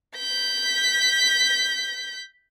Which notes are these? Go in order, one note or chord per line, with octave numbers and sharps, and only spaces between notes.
G6 B6